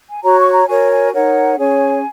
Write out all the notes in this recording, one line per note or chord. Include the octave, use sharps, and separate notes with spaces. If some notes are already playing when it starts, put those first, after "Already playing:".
G#5
F#4 C#5 A#5
C#6
A#5
F#4 A#4 C#5 G#5
G#5
D#4 A#4 C#5 F#5
C#4 G#4 C#5 G#5